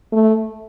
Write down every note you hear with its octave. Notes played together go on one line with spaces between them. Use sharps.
A3